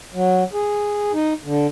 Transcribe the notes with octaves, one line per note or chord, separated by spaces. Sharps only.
F#3
G#4
D#4
D3